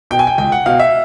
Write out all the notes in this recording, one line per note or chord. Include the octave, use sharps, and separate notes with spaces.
B2 G5
G#5
G5
C#2 G5
F#5
B2 F5
E5